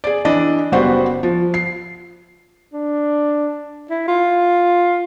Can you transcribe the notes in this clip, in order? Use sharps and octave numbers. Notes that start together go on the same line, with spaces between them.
G#4 D5
E3 D4 D#5
F#1 G3 B3 F#4 C5
F3
C7
D4
E4
F4